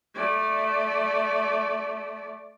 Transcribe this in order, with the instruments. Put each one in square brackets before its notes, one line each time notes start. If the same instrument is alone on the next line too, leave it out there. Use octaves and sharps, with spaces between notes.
[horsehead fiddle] A3 D5